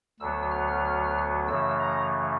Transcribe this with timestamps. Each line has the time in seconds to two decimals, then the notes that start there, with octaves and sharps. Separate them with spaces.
0.20 D2 D3 F#3 B3 E6
0.51 F6
1.48 F#2 C#3 E3 A3 E6
1.80 A#5